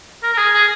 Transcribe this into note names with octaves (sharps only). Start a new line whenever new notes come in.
A#4
A#4
G#4
G#4